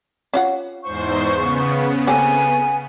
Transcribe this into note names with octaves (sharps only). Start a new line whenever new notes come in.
C#4 F4 F#5
E2 G#2 C5 C#6
C#3 B3
A#3 C4 A4 G#5